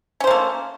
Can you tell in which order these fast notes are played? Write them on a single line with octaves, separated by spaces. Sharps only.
C#4 C5 A#3 A3